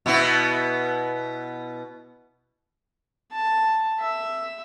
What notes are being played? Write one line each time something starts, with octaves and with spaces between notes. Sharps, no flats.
B2 B3 E4
A5
E5